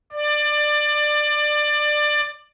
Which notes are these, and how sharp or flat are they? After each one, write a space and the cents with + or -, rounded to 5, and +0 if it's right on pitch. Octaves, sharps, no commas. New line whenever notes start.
D5 +20